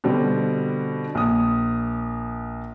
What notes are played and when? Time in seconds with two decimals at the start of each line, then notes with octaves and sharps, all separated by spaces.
0.04 B2 D3 G3 C4
1.15 A#1 D#6